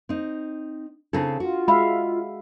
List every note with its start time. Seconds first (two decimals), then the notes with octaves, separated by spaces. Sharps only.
0.09 C4 D#4
1.13 C#3 C4 D4 E4 A4
1.40 F4 F#4
1.68 G#3 E5 F5 B5